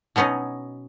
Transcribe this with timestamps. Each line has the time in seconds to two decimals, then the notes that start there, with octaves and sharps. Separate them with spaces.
0.16 B2 F#3 B3 C#4 D#4